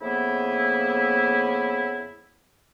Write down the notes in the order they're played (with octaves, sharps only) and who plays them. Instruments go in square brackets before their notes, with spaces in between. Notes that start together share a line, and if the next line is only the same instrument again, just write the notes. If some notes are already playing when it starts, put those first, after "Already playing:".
[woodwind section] F2 C#3 A#3 B3 E4